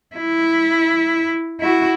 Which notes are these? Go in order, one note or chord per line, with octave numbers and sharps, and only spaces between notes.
E4
E4 F#4